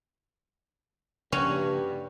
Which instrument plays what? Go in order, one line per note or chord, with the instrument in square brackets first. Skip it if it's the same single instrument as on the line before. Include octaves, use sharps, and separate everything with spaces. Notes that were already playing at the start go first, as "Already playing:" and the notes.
[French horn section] G2 [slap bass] C#3 F3 A#3 [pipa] C#4 F#4